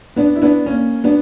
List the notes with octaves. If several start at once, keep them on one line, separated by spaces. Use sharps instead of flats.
B3 D4
E4
B3 D4
A#3 C#4
B3 D4